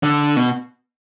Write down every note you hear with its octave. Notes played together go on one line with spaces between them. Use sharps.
D3
B2